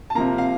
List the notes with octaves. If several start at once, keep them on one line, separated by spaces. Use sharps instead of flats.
A5
C3 F3 A#3 A#5
F5